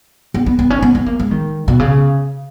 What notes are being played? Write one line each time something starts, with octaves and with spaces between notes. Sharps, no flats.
B3
B3
B3
C#4
B3
B3
A#3
G#3
D#3
B2
C#3